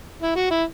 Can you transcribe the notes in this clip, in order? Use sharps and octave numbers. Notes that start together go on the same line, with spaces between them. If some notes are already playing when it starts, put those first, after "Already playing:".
E4
F#4
E4